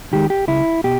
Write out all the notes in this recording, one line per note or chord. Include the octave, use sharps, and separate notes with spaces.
D#3 G#3 G4
G4
C#2 E4
B2 G4